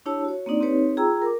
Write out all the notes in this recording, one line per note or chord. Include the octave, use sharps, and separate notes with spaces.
D4 E4 G4 C#5 A5 E6
F#4 C#5
A#3 C4 D4 D#4 D5
C4 D#4 G4 B4 C#5
F4 G#4 G5 A#5 E6
A#4 D6